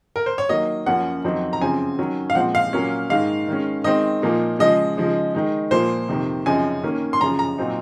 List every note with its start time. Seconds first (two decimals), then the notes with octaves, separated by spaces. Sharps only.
0.16 A#4
0.26 C5
0.38 C#5
0.49 D#3 F#3 A#3 D#5
0.86 F#2 F3 A#3 C#4 F#5
1.24 F2 D#3 F#3 C4 D#4
1.53 A#5
1.61 F#2 C#3 F3 C4 G#5
1.99 D#3 F#3 C#4
2.30 F5
2.35 A#2 F3 G#3 C4 F#5
2.55 F5
2.73 A#2 F#3 A#3 C#4
3.10 G#2 D#3 G#3 F5
3.48 D#3 G#3 C#4
3.84 D#3 G#3 C4 D#4 D#5
4.22 A#2 F3 A#3 D#4
4.59 C#3 F3 G#3 D#5
4.97 C#3 F3 G#3 D#4
5.34 D#3 G#3 D#4
5.71 A#2 F3 A#3 C5
6.09 F2 C3 D#3
6.46 F#2 C#3 F3 C4 D#4 G#5
6.83 D#3 A#3 C#4
7.13 C6
7.21 F#2 C#3 F3 A#5
7.39 A#5
7.58 A#2 F#3 C4 D#4